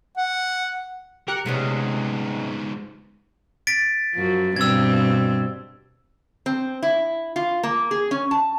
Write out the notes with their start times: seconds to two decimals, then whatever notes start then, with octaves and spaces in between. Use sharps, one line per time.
0.17 F#5
1.28 G4 A#4 F#6 C#7
1.46 G#2 C3 G#3 B3 C#4
3.67 A6 B6 D7
4.15 F#2 F3
4.56 G2 B2 C4 E6 G#6
6.46 C4
6.83 E4
7.36 F4
7.63 A#3
7.91 G#4
8.11 C#4
8.31 A5